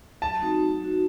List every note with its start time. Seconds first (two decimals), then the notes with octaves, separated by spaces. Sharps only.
0.22 F#3 A5
0.41 A3 C4 D#4 F#4
0.61 F#3
0.80 A3 C4 D#4 F#4